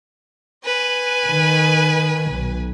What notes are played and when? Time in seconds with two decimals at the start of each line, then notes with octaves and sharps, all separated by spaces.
0.65 B4 G#5
1.26 D#3
2.31 B1